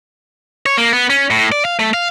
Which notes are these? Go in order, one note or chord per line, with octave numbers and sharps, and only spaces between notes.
C#5
A#3
B3
C#4
A2
D5
F5
A3
F5